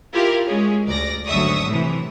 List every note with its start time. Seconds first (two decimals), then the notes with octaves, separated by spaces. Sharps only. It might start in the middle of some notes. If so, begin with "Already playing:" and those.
0.13 E4 F4 G4 A#4 F5
0.45 G#3 C#4 G#4
0.87 D2 D5 A#6
1.27 G#1 D2 F#3 E5 C#6 D#6
1.68 A2 C3 E3